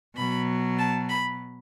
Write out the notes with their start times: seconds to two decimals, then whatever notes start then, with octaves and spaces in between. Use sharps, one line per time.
0.15 B2 F#3 B5
0.78 A5
1.09 B5